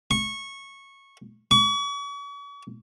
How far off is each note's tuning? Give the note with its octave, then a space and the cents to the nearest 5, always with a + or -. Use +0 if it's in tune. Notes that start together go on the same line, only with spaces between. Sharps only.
C#6 -15
C#6 +40